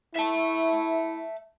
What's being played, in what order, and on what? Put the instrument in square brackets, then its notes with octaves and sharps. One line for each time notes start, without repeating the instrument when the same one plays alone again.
[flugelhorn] E4 [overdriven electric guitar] E5 A5